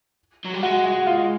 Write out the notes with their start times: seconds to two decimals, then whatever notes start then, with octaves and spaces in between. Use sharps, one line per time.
0.45 F#3
0.54 G3
0.63 G#3 F#4
0.85 F#4
1.06 F4